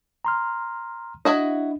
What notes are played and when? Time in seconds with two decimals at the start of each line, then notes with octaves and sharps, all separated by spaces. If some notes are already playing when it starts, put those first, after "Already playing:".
0.25 A#5 C6 F6
1.25 D4 E4 F#4 D#5